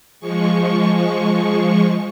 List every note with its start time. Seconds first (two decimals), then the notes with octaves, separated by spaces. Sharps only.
0.20 F3 G#3 C#6